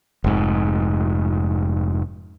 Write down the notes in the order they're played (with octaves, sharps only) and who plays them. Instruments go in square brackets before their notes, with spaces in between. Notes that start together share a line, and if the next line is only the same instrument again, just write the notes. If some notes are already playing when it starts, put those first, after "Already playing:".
[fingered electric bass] F1 G#2